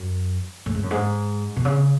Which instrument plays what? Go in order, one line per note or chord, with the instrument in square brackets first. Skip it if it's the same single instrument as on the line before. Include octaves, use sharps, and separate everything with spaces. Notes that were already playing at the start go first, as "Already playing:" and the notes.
Already playing: [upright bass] F#2
A2
G#2
F#2
G#2
B2
C#3